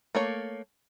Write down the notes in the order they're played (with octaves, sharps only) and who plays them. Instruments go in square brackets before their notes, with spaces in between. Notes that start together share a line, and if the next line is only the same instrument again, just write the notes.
[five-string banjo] A3 A#3 C#5